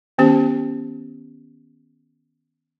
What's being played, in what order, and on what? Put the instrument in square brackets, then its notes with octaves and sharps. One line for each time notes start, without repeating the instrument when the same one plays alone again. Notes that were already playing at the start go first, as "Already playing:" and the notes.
[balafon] D#3 B3 C#4 G4 C5 A5